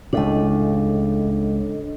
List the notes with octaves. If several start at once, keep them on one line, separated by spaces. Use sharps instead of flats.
C#2 A2 D4 A4 D#5